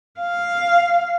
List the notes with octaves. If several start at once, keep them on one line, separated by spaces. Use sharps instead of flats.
F5